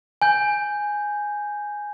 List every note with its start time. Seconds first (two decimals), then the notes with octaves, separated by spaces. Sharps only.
0.22 G#5 G6